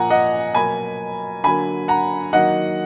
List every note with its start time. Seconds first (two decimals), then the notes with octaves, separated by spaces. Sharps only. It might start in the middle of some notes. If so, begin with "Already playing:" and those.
Already playing: A#2 F3 A#3 F#5 G#5 A#5
0.10 D#5 F#5
0.55 B2 F#3 A#3 G#5 B5
1.44 D3 F#3 A#3 G#5 B5
1.88 F#5 A#5
2.33 D#3 F#3 A#3 D#5 F#5